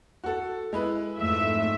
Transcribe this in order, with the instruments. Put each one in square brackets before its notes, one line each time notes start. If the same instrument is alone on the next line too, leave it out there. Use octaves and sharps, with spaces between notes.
[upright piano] F#4 A4
G#3 E4 B4
[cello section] F2 G#2 A3 [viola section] E5